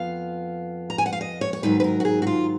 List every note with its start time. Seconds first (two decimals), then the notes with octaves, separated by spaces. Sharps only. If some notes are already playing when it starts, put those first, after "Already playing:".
Already playing: F2 F3 B3 F5
0.90 A#5
0.98 G#5
1.06 F#5
1.13 F5
1.21 D#5
1.41 C#5
1.53 C#5
1.63 G#2 D#3 F#3 B4
1.80 B4
1.84 A#4
2.00 F#4
2.05 G#4
2.22 F#4
2.27 F4